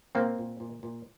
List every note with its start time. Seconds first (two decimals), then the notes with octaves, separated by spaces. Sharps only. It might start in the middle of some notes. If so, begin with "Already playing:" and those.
0.15 A#2 A#3 C4
0.38 A#2
0.60 A#2
0.83 A#2